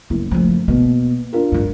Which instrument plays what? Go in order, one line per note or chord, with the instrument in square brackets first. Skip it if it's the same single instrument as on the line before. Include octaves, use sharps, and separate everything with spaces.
[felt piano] F#1 E4 [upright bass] F#3
[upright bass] F3 A3
[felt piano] B2 [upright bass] A#3
[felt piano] D4 F4 A#4
[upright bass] G2 D#3